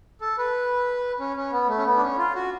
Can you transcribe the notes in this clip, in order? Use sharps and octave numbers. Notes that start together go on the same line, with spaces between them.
A4
B4
C#4
C#4
B3
A3
C#4
B3
D4
C#4
F4
F#4